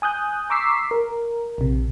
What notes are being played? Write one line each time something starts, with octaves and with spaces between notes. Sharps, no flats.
G#5 D#6 F#6 G6
A#5 C#6 D6 E6 B6 C7
A#4
A#1 C3